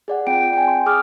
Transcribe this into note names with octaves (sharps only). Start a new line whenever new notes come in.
G#4 D5 F#5
C4 F4 G5 D7
G5 G#5
C6
G#4 D6 D#6 F6